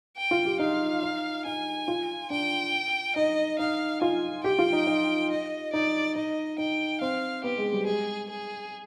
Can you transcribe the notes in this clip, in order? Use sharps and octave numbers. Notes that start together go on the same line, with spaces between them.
G5
F4
G4
D#4 F5
D#4
D#4 G#5
F4
D4 G5
D#4 D#5
D#4 F5
F4 G#5
G4 G5
F4
D#4
D#4
D#5
D#4 D5
D#4 D#5
D#4 G5
C4 F5
B3 G4
G#3
G3
G#3 G#4
G#4